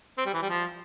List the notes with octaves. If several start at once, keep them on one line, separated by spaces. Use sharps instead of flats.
C4
G3
E3
G3
F3